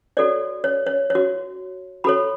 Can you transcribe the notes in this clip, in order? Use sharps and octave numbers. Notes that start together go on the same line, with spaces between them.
F#4 A4 C#5 D5
C#5
C#5
C#5
F#4
F#4 A4 C#5 B5